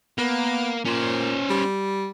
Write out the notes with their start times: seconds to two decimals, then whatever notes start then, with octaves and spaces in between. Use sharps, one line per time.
0.18 A#3 B3
0.85 A#2 C#4 C5
1.50 G3